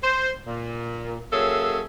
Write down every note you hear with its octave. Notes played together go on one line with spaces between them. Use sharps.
C5
A#2
F#3 A#3 C#4 G#4 A4 E5